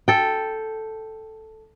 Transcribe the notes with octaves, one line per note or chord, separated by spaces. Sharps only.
A4 G5